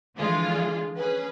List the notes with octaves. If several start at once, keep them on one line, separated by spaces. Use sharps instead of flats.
D3 E3 F3 G#3 F4 G#4
C#4 G#4 B4